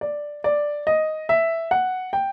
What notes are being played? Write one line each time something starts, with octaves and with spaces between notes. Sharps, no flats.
D5
D5
D#5
E5
F#5
G5